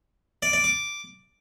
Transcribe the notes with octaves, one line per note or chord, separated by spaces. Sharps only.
D5
D5
D6